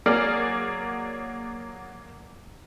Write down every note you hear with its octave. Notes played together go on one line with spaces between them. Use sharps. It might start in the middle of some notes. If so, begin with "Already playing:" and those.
F#3 A#3 G#4 D5 F6